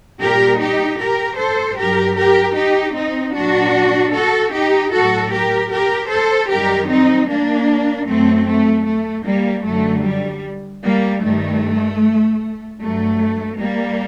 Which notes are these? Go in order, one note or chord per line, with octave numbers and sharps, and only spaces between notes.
A#2 G3 G4 A#4
D#4 G4
G4 A#4
A4 C5
G2 F#3 G4 A#4
G4 A#4
D#4 G4
C4 D#4
A#2 F#3 D4 F#4
F#4 A4
D#4 G4
A2 F#3 F#4 A4
G4 A#4
G4 A#4
A4 C5
F#2 D#3 G3 G4 A#4
C4 D#4
A#3 D4
F#2 F#3 A3 C4
A3
A3
G3 A#3
F#2 D3 F#3 A3
G3
G3 A#3
G2 D#3 G3 A3
G2 F#3 A3
G3 A#3